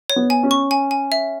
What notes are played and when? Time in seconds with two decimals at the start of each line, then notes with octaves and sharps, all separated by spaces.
0.10 C#5
0.16 B3
0.30 G#5
0.43 C#4
0.51 C#6
0.71 G#5
0.91 G#5
1.12 E5